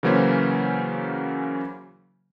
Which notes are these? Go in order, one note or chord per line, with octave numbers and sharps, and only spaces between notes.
C#3 E3 F#3 A#3 C#4 C5